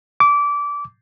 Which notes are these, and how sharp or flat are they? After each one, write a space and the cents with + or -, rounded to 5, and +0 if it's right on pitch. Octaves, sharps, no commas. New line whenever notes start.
D6 -20